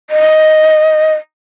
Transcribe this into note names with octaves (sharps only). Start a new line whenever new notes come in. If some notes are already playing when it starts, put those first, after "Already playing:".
D#5